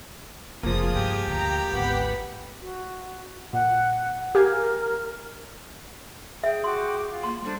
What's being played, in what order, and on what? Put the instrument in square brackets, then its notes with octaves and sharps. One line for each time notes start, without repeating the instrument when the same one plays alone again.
[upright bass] F1 [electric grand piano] F3 A#3 [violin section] F4 G#4 D#6
[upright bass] G2 [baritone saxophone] G4
[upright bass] D2 A3 [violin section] G5 A#5
[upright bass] G#1 D2 [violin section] B3 F#5 B5
[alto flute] F#4
[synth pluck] A#2 [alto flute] F#5
[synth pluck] G4 F5 G#5 [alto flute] A#4
[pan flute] G#4 [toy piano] E5 [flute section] G5
[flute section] F#4 G5 D6 [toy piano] C6
[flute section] F4
[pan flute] A#3 [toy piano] C6
[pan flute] G3 [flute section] D4 A4 C5